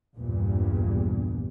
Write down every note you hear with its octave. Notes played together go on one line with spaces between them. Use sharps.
A#1 E2 G2 A#2